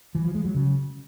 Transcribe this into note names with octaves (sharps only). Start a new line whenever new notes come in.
E3
F3
G#3
F#3
C#3